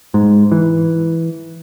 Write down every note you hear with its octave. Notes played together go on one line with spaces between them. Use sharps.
G#2
E3